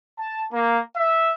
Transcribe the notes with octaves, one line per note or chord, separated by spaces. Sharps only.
A5
A#3
E5